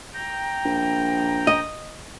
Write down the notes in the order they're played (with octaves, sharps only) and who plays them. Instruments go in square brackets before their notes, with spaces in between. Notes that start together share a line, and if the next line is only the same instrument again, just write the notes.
[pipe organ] G5 A#5
[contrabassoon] A#1
[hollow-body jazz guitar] D#5